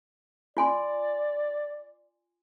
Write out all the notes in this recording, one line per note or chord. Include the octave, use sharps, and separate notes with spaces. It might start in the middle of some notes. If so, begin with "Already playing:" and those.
F4 D5 G#5 C6